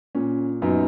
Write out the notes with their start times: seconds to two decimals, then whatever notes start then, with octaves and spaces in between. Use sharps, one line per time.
0.15 A#2 C#4
0.62 F#2 B3 D#4